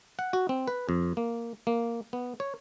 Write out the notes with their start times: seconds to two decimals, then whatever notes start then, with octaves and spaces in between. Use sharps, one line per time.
0.19 F#5
0.33 F#4
0.49 C4
0.67 B4
0.89 F2
1.17 A#3
1.67 A#3
2.13 B3
2.40 C#5